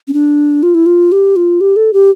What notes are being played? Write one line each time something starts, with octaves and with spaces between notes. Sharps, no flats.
C#4
D4
F4
E4
F4
G4
F4
G4
A4
G4